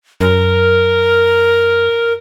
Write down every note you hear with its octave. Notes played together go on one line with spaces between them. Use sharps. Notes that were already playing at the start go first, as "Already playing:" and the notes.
F#2 A#4